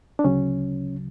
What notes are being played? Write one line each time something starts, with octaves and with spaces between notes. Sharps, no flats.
D4
D2 C#3 F#3 C#4